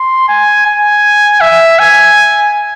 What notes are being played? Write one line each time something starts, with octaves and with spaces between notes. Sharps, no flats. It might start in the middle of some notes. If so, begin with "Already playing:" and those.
Already playing: C6
G#5
G#5
E5
G#5